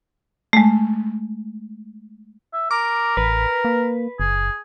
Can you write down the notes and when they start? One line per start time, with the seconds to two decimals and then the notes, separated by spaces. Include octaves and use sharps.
0.53 G#3 A3
2.53 E5
2.71 A#4 D6
3.17 A1 B4
3.65 A#3
4.20 F#1 G#4